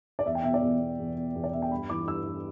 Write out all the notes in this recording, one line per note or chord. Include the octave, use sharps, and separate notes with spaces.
D5
E2 E5
G5
B2 E5
D5
E2
B2
E2
B2
E2
D5
B2 E5
G5
G2 B5
E3 D6
G2 E6
E3